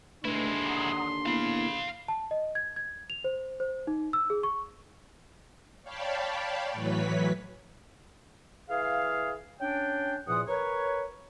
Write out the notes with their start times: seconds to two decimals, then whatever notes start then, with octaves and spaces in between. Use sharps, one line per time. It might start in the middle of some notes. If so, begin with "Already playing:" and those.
0.25 D#2 D3 G#3 A3 D4 E4 B4 C6
0.66 F#5 A#5 D#6
1.26 A#3 B3 E4 F5 B5
2.08 A5
2.31 D#5
2.55 G#6
2.76 G#6
3.10 F7
3.24 C5
3.60 C5
3.87 D#4
4.13 E6
4.30 G#4
4.43 C#6
5.83 C#5 D5 F5 G5 A5 B5
6.72 A2 E3 F#3 B4 C#5 B6
8.69 E3 G#4 F5
9.59 C#4 D4 G5
10.27 E2 A#2 F3 F#5 D#6
10.47 A#4 B4 C#5